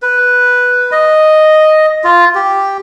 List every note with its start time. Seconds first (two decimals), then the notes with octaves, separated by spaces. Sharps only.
0.02 B4
0.92 D#5
2.04 F4
2.35 G4